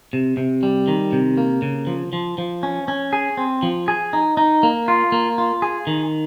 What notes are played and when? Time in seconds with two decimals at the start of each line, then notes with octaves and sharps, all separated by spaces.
0.13 C3
0.37 C3
0.63 G3
0.88 D#3
1.12 C3
1.37 A#3
1.62 C#3
1.87 F3
2.13 F3
2.38 F3
2.63 C#4
2.88 C#4
3.13 G#4
3.37 C4
3.63 F3
3.88 G#4
4.13 D#4
4.37 D#4
4.63 A#3
4.88 F4
5.12 A#3
5.38 F4
5.62 G#4
5.87 D#3